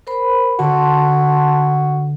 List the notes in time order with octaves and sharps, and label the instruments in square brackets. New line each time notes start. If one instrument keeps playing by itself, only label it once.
[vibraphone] A#4 C5 B5
[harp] D3 [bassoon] F#4 [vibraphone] A5 C6